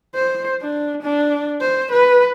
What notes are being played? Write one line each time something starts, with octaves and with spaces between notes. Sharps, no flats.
C5
D4
D4
C5
B4